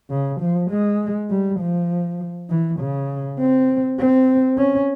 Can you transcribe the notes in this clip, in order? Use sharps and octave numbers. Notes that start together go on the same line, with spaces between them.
C#3
F3
G#3
G3
F3
E3
C#3
C4
C4
C#4